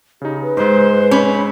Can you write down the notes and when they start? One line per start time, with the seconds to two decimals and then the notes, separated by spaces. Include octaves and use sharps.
0.21 C#3 D#4 G4
0.42 B4
0.57 G#2 G#3 C5
1.11 C#4 B5